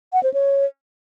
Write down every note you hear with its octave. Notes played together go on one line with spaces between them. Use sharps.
F#5
C5
C#5